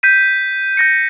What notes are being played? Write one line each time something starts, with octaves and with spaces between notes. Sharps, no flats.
G6 B6 D#7
G6 A#6 C#7